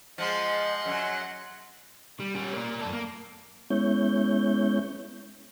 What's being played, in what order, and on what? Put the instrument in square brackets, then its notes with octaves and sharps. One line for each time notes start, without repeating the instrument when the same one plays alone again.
[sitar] F3 G#3 [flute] D#5 [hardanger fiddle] F#5 C6
[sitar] F#2 F#3
[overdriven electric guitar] G3
G3 C#4
A#3 D5
F#2 A4
A#3
[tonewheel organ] G#3 B3 C#4 E4 C#5 G6